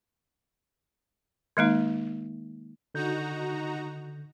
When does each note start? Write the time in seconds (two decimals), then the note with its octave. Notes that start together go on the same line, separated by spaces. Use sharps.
1.57 D#3 G#3 A#3 D#4
2.95 D3 D#4 F#4 A#5 G6